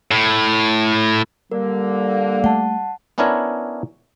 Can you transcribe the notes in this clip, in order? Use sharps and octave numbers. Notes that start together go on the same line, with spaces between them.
A2
D3 G3 A#3 A#4
A3 F#5 A5
B3 C#4 D4 E4 A#4 C#5